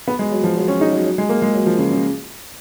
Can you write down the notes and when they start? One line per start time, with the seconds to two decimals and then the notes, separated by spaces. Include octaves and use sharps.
0.08 B3
0.19 G#3
0.31 F#3
0.44 F3
0.57 F#3
0.68 C#4
0.81 D#4
0.93 F#3
1.06 F#3
1.18 G#3
1.29 A#3
1.42 G#3
1.54 F#3
1.66 F3
1.78 C#3
1.91 C#3